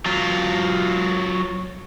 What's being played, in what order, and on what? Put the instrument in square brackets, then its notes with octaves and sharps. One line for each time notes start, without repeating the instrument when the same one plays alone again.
[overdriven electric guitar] F#3 F4